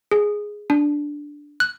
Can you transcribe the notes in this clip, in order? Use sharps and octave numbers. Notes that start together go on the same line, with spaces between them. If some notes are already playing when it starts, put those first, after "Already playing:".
G#4
D4
F#6